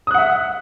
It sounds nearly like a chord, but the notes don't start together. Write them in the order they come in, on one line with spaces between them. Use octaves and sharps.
D#6 F#6 F#5 E5